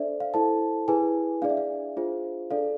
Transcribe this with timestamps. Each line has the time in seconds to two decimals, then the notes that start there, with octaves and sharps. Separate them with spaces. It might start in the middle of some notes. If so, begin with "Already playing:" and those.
Already playing: D4 A4 C5 D5 E5
0.20 F5
0.34 E4 A4 C5 A5
0.88 E4 G#4 B4 G#5
1.42 D4 G#4 D5 F5
1.50 E5
1.57 F5
1.97 D4 F4 G#4 C5
2.51 D4 A4 D5 F5